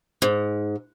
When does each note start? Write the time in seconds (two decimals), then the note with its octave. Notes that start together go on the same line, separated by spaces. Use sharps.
0.22 G#2